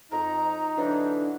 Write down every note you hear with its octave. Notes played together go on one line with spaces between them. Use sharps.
F2 D#4 A#5
D3 E3 F#3 D4